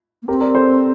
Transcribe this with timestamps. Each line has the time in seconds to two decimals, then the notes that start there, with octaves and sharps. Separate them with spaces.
0.23 A#3
0.28 C4 G4 A#4
0.41 A#4 D5
0.55 A4 C5